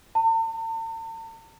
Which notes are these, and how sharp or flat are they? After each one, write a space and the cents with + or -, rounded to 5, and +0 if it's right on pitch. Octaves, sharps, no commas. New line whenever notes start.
A5 +45